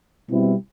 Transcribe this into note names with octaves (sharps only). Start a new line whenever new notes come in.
B2 G3 C4 E4